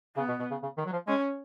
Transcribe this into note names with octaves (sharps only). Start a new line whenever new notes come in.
C#3 B3
B2
B2
C#3
C#3
D#3
F#3
F3
G#3 C#4